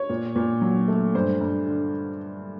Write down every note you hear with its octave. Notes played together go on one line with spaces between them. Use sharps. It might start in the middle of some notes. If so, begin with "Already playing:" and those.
Already playing: C#5
A#2
A#2
F#3
A3
G2 C5
G2
D3